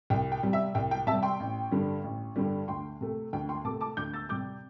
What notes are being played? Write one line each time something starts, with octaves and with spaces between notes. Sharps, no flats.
C2 G5
G5
C3 G3
E5
C2 G5
G5
C3 G3 E5 A5
G5 C6
A1
G2 D3 G3
A1
G2 D3 G3
D2 G5 C6
C3 A3
D2 G5
G5 C6
C3 A3 A5 D6
A5 D6
D2 D6 G6
E6 A6
C3 G3 D6 G6